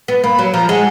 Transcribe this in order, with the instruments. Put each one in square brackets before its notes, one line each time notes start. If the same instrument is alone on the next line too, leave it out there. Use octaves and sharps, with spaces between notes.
[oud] B3
[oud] A#3 [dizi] B5
[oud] F#3
[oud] F3 [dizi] A#5
[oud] G#3 [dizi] F#5